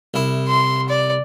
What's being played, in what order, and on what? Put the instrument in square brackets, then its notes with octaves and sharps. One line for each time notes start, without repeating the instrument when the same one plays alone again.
[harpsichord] C2 E4
[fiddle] C6
D5